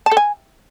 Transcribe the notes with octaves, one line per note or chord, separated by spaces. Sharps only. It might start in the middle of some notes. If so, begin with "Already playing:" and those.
A5
A4
G#5